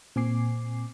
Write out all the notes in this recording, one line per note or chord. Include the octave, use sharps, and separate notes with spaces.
A#2 C4 G#5 D6 C7